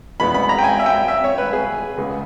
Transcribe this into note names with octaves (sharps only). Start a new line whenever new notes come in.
E2 B2 G#3 B3 B5
B5
A#5
G5
G#5
E5
G5
E5
C#5
B4
G#4
C#2 C#3 G#3 B3